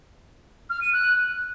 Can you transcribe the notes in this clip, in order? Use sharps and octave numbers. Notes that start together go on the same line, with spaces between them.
F6
D#7
F#6